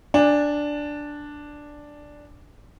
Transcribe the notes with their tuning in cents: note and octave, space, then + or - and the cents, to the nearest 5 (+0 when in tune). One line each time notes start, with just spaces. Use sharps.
D4 +0 G#5 -20